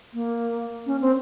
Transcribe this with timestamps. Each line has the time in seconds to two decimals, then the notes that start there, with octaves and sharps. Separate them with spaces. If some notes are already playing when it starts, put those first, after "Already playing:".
0.14 A#3
0.87 C#4
1.01 C4